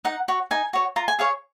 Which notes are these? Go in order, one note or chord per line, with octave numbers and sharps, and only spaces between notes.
D#4 F#5
F#4 C#5
D#4 G#5
F#4 C#5
F4 A#5
G#5
G#4 C#5 F5